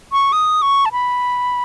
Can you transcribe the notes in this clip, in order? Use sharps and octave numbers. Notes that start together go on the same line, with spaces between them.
C#6
D#6
C#6
A5
B5